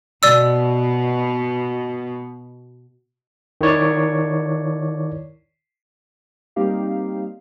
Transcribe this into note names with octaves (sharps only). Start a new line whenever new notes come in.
B2 D5 E6
D#3 E4 C#5 D5
G3 A#3 C4 D#4 G4 F5